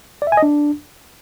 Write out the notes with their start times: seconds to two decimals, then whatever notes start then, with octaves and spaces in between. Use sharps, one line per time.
0.22 D5
0.27 E5
0.32 G#5
0.37 D#5
0.43 D4